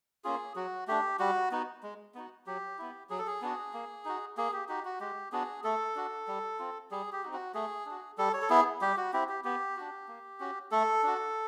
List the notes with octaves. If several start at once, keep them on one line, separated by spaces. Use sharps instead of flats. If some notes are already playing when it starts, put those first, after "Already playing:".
A#3 C#4 F4 G#4
F#3 F#4
A3 D4 G4
G3 F#4
B3 D#4 F#4
G#3
B3 D#4 F#4
F#3 G4
B3 E4
F#3 G#4
A4
G#4
B3 D4 F#4
A#3
D#4 F#4
A#3 G#4
G4
D#4 F#4 G4
F#4
G#3 G4
B3 D4 F#4 G#4
A3 A4
D4 F#4
G3
C4 F4
G3 G#4
G4
C4 D#4 F#4
F#4
A3 G#4
D4 F#4
G3 A4
C#5
A4
B3 E4 G#4
G3 G4
F#4
C4 E4 G4
G4
B3 G4
D4 F#4
A#3
C#4 F#4
A3 A4
D4 F#4